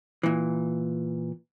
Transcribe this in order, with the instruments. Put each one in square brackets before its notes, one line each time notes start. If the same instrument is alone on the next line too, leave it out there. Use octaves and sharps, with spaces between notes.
[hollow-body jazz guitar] A#2 E3